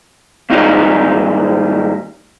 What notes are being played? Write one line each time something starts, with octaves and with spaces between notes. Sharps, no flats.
D#2 G#2 G3 D#4 F4